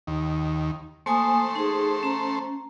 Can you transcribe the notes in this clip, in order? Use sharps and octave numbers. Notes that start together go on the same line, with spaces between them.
D#2
A3 A#3 C5 G#5 D#6
D#4 G#4
C#4 A#5